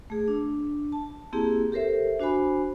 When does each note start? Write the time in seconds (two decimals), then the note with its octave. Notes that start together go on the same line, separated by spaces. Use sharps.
0.10 A3 G#4
0.28 D4
0.92 A5
1.33 A#3 C4 E4 G4 G#4
1.72 G4 A4 A#4 C5 E5
2.20 D4 F#4 C5 G#5 B5